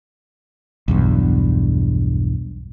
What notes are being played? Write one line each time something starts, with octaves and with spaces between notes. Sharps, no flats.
B1 E2 G2